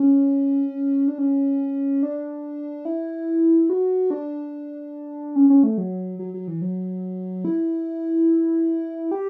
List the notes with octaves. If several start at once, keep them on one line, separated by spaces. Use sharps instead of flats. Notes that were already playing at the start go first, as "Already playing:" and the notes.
Already playing: C#4
D4
C#4
D4
E4
F#4
D4
C#4
C#4
A3
F#3
F#3
F#3
E3
F#3
E4
G4